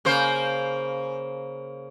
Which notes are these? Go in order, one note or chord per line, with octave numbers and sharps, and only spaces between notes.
C#3 A#3 C5